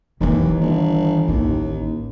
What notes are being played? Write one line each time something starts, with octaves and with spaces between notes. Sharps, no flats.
D#2 D#3 E3
G1
A1 D#2 D#4